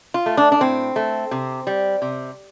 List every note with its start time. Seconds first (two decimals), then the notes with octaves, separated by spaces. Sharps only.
0.14 F4
0.26 A3
0.37 D4
0.52 D4
0.61 A2 C4
0.96 A3
1.31 C3
1.67 G3
2.02 C3